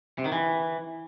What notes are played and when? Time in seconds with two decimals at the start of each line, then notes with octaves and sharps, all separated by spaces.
0.18 C3
0.25 D#3
0.32 E3